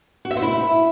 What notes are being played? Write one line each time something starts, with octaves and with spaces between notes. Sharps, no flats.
F#4
E5
C5
E4